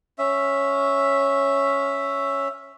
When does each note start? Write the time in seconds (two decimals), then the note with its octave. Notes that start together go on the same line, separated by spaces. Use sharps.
0.18 C#4 E5